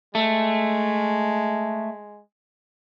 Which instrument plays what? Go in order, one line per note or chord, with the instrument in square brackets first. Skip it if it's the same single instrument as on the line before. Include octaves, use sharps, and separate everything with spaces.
[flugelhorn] G#3 [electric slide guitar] A3